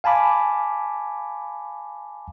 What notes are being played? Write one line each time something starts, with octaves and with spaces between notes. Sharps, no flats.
F5 G#5 A5 B5 D6